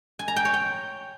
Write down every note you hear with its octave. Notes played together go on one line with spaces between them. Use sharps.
G#5
A#5
G5
C#5
G5